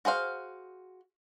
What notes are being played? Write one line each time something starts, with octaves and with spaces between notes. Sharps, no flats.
F#4 G#4 C5 F5